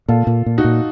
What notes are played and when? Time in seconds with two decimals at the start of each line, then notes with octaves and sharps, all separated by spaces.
0.08 A#2 F4 A4
0.27 A#2
0.46 A#2
0.58 D#4 F#4
0.64 A#2